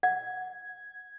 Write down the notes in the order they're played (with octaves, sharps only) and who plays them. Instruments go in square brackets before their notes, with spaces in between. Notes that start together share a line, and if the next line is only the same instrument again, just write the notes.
[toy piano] F#5 [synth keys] G#6